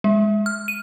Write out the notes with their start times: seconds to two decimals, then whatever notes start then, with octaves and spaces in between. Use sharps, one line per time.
0.04 G#3
0.46 F6
0.68 D#7